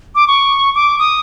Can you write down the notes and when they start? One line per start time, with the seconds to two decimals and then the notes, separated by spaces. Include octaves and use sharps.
0.15 D6
0.27 C#6
0.75 D6
0.99 D#6